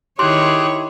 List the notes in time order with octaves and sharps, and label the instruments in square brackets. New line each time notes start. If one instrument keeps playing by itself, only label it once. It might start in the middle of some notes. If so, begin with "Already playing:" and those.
[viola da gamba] D#3 E4 C#5 [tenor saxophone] G4 [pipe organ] G#4 F#6 [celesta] C6